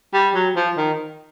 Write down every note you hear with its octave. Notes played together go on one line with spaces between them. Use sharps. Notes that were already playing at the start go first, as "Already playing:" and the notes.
G3
F#3
F3
D#3